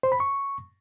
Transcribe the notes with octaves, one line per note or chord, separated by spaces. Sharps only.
C5
B5
C#6